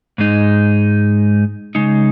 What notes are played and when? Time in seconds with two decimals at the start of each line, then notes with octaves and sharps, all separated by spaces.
0.18 G#2 G#3 D#4
1.75 C#3 G#3 D#4